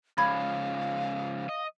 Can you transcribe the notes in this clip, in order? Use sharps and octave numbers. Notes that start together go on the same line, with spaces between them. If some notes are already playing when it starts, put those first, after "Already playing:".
C#3 F3 G#3 F5 B5 G#6
D#5